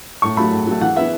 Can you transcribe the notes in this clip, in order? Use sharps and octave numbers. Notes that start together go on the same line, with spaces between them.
A2 C#6
F#3 A3 B5
A2
F#3 A3
E3 F#5
B3 E4 E5